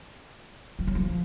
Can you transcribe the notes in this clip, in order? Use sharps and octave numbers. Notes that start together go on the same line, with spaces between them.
F3
F#3
F3